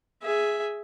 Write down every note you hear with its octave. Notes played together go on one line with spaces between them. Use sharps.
G#4 E5